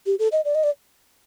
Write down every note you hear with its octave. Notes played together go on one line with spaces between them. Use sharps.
G4
A4
D#5
D5
D#5
D5